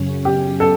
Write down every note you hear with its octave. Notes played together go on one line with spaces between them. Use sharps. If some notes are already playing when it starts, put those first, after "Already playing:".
Already playing: F#2 C#3 F#3 C#4
G4
A4